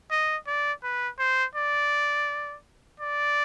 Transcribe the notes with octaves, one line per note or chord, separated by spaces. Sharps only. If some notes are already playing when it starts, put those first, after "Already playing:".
D#5
D5
B4
C5
D5
D5